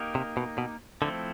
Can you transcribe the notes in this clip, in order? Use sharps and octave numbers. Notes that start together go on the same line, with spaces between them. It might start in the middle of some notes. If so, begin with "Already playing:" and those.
Already playing: A#3 D#4 G4 A#4
C3
B2
B2
D3 F3 A3 C4 E4 A4